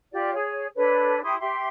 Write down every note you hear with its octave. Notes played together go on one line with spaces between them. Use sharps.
F4 G4 D5
G#4 C#5
D4 A4 B4 C#5
E4 G4 C6 D#6
G4 E5 C6